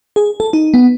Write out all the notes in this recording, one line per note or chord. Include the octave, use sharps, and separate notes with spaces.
G#4
A4
D#4
B3